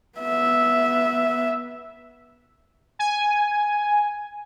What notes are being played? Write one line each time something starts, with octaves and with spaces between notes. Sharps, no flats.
B3 E5
G#5